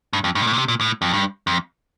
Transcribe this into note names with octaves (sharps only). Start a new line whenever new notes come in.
G2
F2
G2
A#2
A2
A#2
C3
A#2
A2
F2
G2
F2